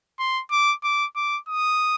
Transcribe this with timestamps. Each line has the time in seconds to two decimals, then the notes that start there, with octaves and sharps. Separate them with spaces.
0.19 C6
0.51 D6
0.84 D6
1.16 D6
1.48 D#6